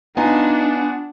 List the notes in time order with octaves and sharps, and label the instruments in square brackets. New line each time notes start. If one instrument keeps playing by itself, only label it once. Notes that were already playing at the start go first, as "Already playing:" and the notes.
[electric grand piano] B3 F4 G#5 [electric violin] D4 [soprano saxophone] D#4 [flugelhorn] F#5